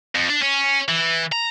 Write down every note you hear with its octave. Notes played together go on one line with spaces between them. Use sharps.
F2
D4
C#4
E3
A#5